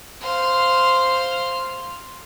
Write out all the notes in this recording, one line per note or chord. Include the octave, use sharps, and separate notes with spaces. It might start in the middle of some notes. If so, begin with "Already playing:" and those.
C5 F5